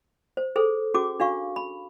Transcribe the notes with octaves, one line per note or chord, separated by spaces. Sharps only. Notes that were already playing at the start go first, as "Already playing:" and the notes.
C5
G#4 A4 C5
C#4 F#4 G#4 D6
D4 F#4 F5 C#6
B5